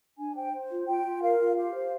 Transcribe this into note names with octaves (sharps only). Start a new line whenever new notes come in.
D4 G#5
C5 G5
C5
F4
F4 G5
F4
A#4 F5
F4
G4 F5
C5